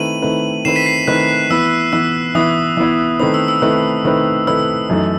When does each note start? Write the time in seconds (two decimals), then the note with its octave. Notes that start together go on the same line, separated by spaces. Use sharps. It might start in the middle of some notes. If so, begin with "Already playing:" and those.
Already playing: D#3 A3 C4 E4 B4 D#7 F#7
0.22 D#3 A3 C4 E4 B4
0.65 D#3 A3 C4 E4 B4 C7 E7
0.76 B6 D#7
0.86 C7
1.07 D#3 A3 C4 E4 B4 F#6
1.50 E3 B3 E4 E6
1.93 E3 B3 E4 E6
2.35 E3 B3 E4 D#6
2.77 E3 B3 E4
3.20 D#3 A3 C4 E4 B4 D#6
3.34 E6
3.48 E6
3.62 D#3 A3 C4 E4 B4
4.05 D#3 A3 C4 E4 B4
4.47 D#3 A3 C4 E4 B4 E6
4.90 F#2 E3 A3 D#4